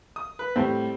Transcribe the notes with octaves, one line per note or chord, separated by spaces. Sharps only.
D#6
B4
A2 G3 C4